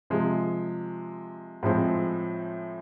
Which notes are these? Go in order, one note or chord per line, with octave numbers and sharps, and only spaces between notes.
C3 F3 G#3
A2 F3 G#3 C4